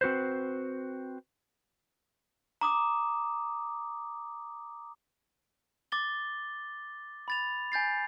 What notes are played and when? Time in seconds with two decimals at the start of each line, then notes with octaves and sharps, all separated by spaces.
0.01 C4 F#4 B4 C5
2.61 A#5 D6 D#6
5.92 D6 A6 G7
7.28 B5 A6 F7
7.72 G#5 G6 A6 C7